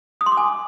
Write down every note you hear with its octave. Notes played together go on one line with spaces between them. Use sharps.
D#6
C6
D6
G#5